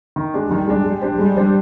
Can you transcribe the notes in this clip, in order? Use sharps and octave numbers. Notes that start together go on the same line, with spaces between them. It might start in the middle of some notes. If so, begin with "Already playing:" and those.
D#3
G#3 D4
D#3 G3
G#3 D4
G3 G#3
D4 G4 C5
G3 G#3
D4 G4 C5